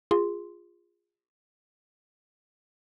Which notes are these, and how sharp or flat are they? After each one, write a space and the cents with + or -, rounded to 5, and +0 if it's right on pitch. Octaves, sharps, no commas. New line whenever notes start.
F4 +0 G#4 -20 C6 +0